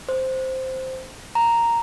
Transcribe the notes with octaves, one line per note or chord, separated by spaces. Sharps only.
C5
A#5